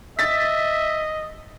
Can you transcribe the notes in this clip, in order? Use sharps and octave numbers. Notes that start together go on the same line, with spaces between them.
D#5 E5 A6 B6